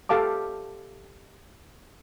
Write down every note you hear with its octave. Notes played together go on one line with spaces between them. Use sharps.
G4 A4 F5 A5 D6